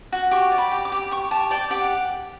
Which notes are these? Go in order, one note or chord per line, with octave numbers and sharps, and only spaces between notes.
F#4
G4 C#6
D5
B5
G4
D6
G4
G4 C#6
G4 A5
D5 G5
G4 F#5